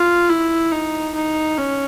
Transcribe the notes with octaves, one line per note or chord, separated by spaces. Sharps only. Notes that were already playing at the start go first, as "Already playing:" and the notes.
Already playing: F4
E4
D#4
D#4
C#4